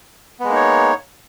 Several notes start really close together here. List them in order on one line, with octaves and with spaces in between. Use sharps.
B3 G#3 A#3 D#4 C#5